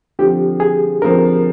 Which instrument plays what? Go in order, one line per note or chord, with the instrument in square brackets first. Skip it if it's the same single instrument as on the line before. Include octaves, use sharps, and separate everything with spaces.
[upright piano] D3 F3 C4 [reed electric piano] G4
[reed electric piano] G#4
[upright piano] D3 F3 C4 [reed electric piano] A#4